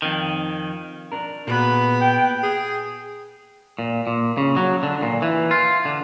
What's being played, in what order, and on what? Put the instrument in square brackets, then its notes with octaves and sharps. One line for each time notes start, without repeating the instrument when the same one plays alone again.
[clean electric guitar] F2 D#3
[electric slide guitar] D4 A#4
[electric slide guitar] A#2 F#4 G#4 [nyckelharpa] B3 B5
[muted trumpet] G5
[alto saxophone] G#4
[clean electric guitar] A#2
A#2
C#3
F#3
D3
A#2
E3
F4
D3